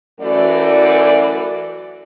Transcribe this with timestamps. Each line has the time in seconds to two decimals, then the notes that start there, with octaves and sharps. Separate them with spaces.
0.21 F#2 E3 A3 F#4 D5